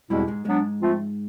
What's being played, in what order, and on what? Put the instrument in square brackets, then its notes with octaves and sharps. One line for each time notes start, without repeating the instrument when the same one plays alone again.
[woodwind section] E2 B2 G#3 C4 E4 [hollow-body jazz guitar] G2 G3
[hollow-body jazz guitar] G#2 G#3
[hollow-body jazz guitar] G#2 G#3 [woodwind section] F#3 B3 D4
[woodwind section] F3 A3 C4 F4